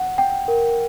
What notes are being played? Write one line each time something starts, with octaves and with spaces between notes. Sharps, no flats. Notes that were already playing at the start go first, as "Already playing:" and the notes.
Already playing: F#5
G5
A#4